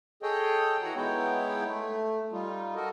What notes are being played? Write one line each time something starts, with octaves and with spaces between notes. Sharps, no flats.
G#4 A4 C#5 D#5 G5
E3 F#4 F#5 A#5
G#3 B3 D#4 E4 C#5 G5
A3
G3 D#4 F4
F#4 A4 A#4 D#5